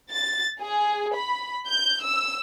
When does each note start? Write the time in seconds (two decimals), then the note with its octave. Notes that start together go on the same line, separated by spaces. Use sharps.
0.10 A6
0.61 G#4
1.15 B5
1.66 G6
2.01 E6